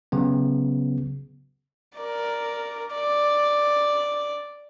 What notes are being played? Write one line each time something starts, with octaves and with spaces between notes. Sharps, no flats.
C#3 F#3 B3
A#4 D5
D5